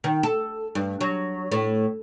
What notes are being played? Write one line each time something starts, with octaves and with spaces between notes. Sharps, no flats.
D#3
A4
G2
F#3
A2